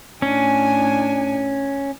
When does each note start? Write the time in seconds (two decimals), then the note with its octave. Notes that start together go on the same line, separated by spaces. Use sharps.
0.22 A2 C#4 D4 G#5